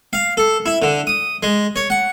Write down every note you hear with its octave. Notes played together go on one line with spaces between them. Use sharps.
F5
A4
E4
D3
D#6
G#3
C#5
F#5